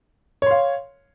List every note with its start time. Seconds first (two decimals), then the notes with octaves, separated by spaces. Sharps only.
0.42 C#5
0.46 C6
0.51 F5